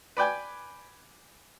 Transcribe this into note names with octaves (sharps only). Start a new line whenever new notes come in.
B4 D5 G5 G#5